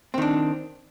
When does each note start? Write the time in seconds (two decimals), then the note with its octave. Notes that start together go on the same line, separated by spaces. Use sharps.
0.14 C4
0.18 D#3
0.22 D4